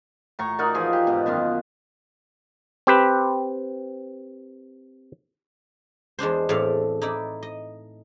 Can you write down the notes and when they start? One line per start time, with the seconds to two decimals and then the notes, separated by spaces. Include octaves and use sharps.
0.39 A2 A#5 C#6
0.59 D#4 F#4 A#4 D5
0.74 E3 F3 G#4
0.93 G4
1.07 G#2 B2
1.26 F#2 B2 D#3 F4
2.87 C4 G4 B4
6.19 E2 G#3 D4 C5
6.49 E2 A2 A3 C4 D5 F5
7.02 D#4 E4 D5
7.43 D#5